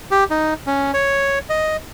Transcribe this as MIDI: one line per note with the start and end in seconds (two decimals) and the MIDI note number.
0.11 0.24 67
0.31 0.54 63
0.67 0.91 61
0.94 1.39 73
1.50 1.77 75